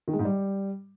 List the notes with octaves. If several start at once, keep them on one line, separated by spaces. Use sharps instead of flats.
D#3
G#3
G#2
G3